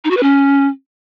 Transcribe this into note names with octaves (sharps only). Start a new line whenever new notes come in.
D#4
F#4
B4
C#4